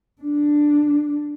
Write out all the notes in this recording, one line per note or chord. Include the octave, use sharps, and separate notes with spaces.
D4